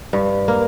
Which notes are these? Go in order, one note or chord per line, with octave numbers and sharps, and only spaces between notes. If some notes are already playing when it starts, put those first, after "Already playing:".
G2
A#3